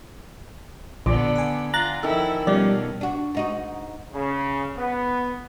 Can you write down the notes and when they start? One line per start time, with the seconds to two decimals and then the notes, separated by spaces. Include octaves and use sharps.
1.06 A#1 D3 B3 D5
1.36 F#5 G#5
1.74 F4 A#5 F#6 A6
2.03 D#3 F3 E4 A4
2.47 B2 F3 G3 C#4 G4 D5 F5
3.01 D4 F#4
3.35 G#2 D#4 F#4
4.13 C#3
4.77 B3